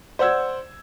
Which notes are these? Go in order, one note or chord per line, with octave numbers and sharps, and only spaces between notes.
C5 D5 F#5 E6 G#6